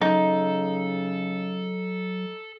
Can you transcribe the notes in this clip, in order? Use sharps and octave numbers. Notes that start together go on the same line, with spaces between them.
C#3 F#3 D#4 A4